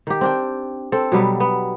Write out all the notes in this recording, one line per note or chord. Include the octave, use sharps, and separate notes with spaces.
D#3 G4
C4 D4 G5
C4 A4
B2 F#3 G3 B3
B3